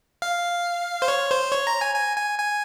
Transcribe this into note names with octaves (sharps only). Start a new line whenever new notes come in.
F5
C5
C#5
C5
C#5
A#5
G#5
G#5
G#5
G#5